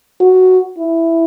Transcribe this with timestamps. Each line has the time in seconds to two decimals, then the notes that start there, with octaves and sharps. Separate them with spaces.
0.21 F#4
0.78 E4